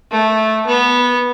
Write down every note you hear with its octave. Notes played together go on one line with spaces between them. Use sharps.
A3
B3